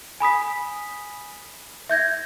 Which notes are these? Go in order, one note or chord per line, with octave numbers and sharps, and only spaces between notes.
G#5 B5 D#6 B6
E5 G6 G#6 A#6